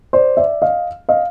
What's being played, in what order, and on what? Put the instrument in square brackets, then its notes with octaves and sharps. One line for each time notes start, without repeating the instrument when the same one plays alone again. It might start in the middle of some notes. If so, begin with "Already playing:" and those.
[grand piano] C5 D5
D5 E5
D#5 F5
D#5 F5